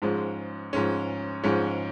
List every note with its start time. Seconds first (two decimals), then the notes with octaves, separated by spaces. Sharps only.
0.02 G#2 F3 G#3 C#4
0.73 G#2 F3 G#3 C#4
1.44 G#2 F3 G#3 C#4